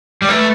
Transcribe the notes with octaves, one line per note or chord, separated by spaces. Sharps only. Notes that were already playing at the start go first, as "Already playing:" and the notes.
G3
A3 B4